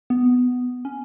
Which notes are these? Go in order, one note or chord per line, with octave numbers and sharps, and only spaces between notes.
B3
C#4